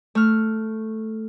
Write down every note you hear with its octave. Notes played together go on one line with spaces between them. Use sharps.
A3 F6